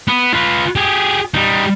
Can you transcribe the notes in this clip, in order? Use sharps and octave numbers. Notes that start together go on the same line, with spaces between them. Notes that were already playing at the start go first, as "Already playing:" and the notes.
B3
F4 B4
G4 G#4
G3 D#4